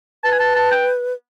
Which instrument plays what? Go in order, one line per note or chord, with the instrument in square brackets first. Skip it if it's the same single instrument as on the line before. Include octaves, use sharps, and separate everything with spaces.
[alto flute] B4 [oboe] A5
[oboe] G#5
A5
A5
G5